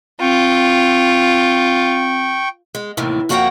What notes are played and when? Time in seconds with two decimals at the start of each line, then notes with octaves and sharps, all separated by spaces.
0.21 C4 F4 G5 C#6
2.75 G#3
2.97 D#2 A2 C3 D#3 E3
3.29 F2 A#3 F#4 F#5 G5 A#5